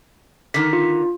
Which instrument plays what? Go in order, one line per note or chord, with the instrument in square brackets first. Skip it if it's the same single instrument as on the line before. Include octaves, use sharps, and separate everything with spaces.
[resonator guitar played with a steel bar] D3 D#3 [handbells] B6
[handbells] F4